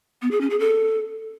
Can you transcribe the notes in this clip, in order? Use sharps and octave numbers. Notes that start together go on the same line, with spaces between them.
B3
G#4
C#4
G#4
A4